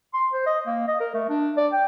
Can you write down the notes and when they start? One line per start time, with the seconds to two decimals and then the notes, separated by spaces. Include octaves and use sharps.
0.14 C6
0.33 C5
0.46 D#5
0.67 A#3
0.88 D#5
1.00 A#4
1.14 A3
1.29 D4
1.57 D5
1.73 G5